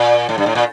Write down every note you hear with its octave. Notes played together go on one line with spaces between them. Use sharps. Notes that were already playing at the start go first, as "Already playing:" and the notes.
Already playing: A#2
A2
G2
A2
A#2